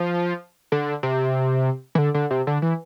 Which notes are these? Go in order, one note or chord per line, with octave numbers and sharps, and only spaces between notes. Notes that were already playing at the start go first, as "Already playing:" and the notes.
Already playing: F3
D3
C3
E3
D3
D3
C3
D3
E3